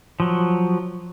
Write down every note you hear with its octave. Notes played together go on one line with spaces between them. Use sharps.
F3 F#3